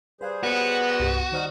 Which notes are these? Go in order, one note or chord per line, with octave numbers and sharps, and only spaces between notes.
G3 G#4 B4 C5 F5 F#6
B3 F#4 G4 C#5 D5
C2 G2 G4
D#3 G3 D#4 C5 F6